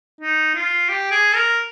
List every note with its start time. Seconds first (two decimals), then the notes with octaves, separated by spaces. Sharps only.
0.21 D#4
0.54 F4
0.89 G4
1.11 G#4
1.35 A#4